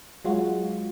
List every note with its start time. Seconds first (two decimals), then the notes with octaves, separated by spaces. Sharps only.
0.25 F#3 G#3 F4 F#4